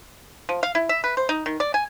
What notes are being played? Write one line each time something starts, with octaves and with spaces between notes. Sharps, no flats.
F3
F5
E4
E5
B4
C5
D#4
D#3
D5
G#5